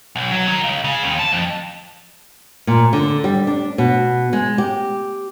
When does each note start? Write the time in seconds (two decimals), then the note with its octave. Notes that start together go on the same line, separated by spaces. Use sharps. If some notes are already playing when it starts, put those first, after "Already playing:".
0.16 B1
0.32 F#3
0.47 D#3
0.64 C#2
0.84 C#3
1.03 D#2
1.19 A5
1.32 F2
2.67 A#2
2.93 D3
3.24 G3
3.47 D4
3.78 B2
4.33 G#3
4.58 G4